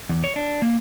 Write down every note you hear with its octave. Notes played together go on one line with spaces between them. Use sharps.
E2
C#5
D4
A#3